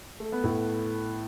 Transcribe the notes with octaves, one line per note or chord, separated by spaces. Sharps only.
A3
B3
A2 A3